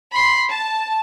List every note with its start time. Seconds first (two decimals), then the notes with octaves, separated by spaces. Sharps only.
0.12 B5 C6
0.50 A5